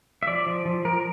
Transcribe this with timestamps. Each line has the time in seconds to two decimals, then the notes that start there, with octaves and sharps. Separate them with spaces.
0.23 E5
0.27 F3 D5
0.46 F3
0.65 F3
0.85 F3 A#4